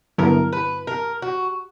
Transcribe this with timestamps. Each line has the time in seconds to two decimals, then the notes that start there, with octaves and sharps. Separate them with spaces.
0.18 G2 D3 F#3 B3 E4 A#4
0.53 B4
0.87 A#4
1.22 F#4